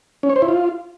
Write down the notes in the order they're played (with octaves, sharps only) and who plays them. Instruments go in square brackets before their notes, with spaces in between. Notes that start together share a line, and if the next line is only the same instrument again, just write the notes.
[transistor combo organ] C#4
C#5
C5
E4
F4